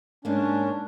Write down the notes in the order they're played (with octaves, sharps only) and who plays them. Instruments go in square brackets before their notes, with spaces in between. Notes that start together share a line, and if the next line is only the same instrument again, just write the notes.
[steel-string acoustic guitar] G#2 A#3 [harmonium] C#4 D4